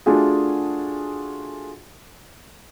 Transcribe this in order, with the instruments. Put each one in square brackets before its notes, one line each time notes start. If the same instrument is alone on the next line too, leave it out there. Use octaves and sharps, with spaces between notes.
[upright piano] A3 D4 F4 F#4 G#4